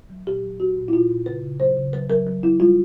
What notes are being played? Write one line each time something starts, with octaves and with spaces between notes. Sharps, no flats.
F#3
A#2 G4
F#3
F#3 F#4
A#2
E4
A#2 F4
A#2
C#3 B4
C#3
F#3 C5
C#3
F#3 B4
F#3 A#4
F#3
F#3 E4
G3 F4